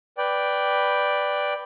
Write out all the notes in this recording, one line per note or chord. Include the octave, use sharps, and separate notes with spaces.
B4 D5 G5